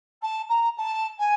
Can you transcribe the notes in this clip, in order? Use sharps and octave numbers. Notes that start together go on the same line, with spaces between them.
A5
A#5
A5
G#5